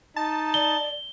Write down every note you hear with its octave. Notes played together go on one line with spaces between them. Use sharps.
D#4 A5
D5 G7